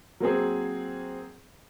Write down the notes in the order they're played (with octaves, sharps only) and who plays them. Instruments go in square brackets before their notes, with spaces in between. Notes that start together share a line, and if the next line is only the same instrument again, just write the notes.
[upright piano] F#3 A#3 C4 G#4